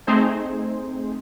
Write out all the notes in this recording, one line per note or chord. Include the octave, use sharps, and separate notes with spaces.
A3 C4 D#4 G#4 C5